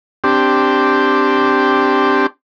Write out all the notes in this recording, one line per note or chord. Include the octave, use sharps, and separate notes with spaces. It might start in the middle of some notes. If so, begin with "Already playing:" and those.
C4 D4 G4